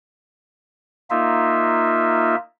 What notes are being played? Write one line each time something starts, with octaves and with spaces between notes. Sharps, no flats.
A#3 D#4 F4 E5